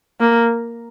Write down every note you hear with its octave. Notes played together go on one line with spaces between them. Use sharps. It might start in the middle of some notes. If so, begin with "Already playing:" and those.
A#3